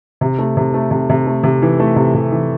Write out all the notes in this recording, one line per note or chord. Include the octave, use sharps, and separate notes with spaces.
C3
A3
C3
A3
C3
C3
A3
C3
E3
A3
C3
C3
E3